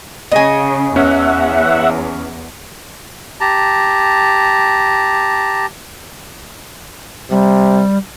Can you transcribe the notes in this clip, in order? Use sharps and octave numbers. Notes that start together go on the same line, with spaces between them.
C#3 D#5 G#5
E2 C#4 E5 F#5
G4 A5 A#5
C3 G3